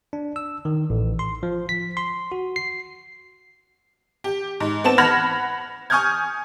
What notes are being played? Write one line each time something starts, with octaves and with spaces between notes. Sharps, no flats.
D4
E6
D#3
A1
C6
F3
B6
C6
F#4
C7
G4
G#2
B3 C4 A5 E7
F#5 B5 F6 G#6 A#6 F7
G#5 C#6 D#6 F6 G6 G#6